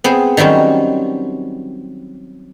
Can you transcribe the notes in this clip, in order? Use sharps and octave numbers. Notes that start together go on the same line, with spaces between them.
B3 C4 G#4 C5
D#3 F#3 G3 C4 C#4